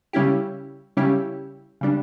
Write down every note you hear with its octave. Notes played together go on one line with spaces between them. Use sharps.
C#3 G3 C#4 E4 G4
C#3 G3 C#4 E4 G4
C#3 G3 D4